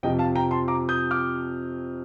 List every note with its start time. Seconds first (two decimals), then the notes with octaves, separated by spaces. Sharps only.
0.03 F2 C3 F3 D#5 G5
0.19 F5 A5
0.35 G5 A#5
0.51 A5 C6
0.68 A#5 D6
0.89 D#6 G6
1.11 D6 F6